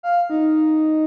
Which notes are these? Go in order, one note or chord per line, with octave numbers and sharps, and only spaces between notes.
F5
D#4